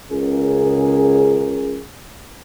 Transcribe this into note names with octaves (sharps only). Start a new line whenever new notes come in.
C#2 C#3 G#4 A#4